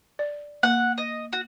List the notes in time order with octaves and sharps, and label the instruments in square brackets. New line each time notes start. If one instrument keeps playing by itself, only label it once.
[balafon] D5
[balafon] A#3 [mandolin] F#5
[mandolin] D#5
F#4